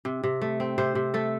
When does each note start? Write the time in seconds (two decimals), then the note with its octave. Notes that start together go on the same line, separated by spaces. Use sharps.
0.05 C3
0.23 C3
0.42 A3
0.60 C4
0.78 C3 C5
0.95 C3
1.14 A3 A4